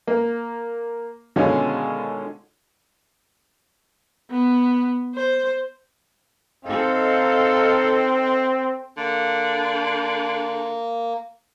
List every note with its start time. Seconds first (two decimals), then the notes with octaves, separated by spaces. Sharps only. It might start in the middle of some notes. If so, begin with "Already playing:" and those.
0.07 A#3
1.36 B2 D3 D#3 G#3 C#4 F4
4.31 B3
5.15 C5
6.65 C4 D#4 A4 F5
8.97 D3 A#3